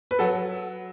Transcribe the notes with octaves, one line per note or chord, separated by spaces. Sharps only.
B4
F#3 F#4 A4